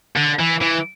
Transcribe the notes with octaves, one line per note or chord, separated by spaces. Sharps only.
D3
E3
E3